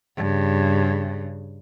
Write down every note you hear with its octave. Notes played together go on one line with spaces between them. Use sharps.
G2 C#3